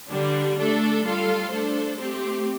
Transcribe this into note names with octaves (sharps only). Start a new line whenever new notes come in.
D3 G3 D4
A3 D4 A4
G3 F4 A4 F5
A3 D4 A4 C5
A3 C4 G4